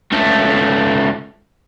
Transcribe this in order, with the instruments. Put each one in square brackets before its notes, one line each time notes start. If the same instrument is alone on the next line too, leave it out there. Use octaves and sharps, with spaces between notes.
[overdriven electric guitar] C#2 A3